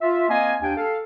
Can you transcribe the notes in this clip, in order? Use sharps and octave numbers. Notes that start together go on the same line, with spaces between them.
F4 E5
A#3 C4 D#5 F5 G#5
D#2 D4 G5 G#5
A4 F5